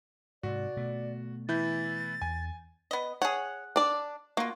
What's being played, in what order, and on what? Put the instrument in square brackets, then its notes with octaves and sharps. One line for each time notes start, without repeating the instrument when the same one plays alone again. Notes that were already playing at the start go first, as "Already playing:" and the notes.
[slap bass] G#2 C3 [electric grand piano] F#4 [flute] D5
[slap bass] B2 A3
[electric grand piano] E3 E4 G6 [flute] A6
[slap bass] E2 [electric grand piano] G#5
[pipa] B3 D#5
[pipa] G#4 F#5 [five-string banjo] C#5
[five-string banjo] D4 D5
[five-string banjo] A#3 [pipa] F4 F#4